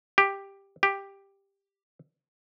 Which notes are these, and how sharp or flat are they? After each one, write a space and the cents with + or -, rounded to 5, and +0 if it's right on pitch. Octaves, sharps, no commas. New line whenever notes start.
G4 +5
G4 +5